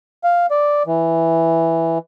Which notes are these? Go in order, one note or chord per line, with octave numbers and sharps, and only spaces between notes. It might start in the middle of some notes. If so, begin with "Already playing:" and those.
F5
D5
E3